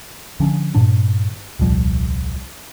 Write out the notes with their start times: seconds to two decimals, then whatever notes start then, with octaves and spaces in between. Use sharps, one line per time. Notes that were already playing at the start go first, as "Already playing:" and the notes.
0.40 D3 F3 C#4 D4
0.75 G2 A#2 D#3 D4
1.59 D#1 C2 F3 G3